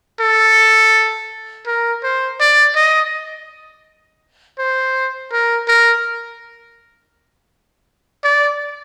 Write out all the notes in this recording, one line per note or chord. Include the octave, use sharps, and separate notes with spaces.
A4
A#4
C5
D5
D#5
C5
A#4
A#4
D5